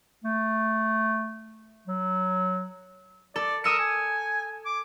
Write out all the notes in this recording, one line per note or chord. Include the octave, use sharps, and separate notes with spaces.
A3
F#3
A4 D5
A#4 D#6 E6 C#7
G#5
D6